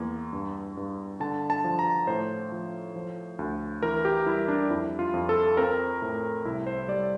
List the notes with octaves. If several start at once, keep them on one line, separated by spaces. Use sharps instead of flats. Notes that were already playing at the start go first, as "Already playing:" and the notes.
Already playing: E2 A#3
G2
G2
D3 A5
A5
F3
A#5
A2 C5
F3
F3
D2
E3 A#4
G4
G3 E4
D4
F2 E4
F4
F2
A4
C4 A#4
A2
C2 E4
C5
G3 D5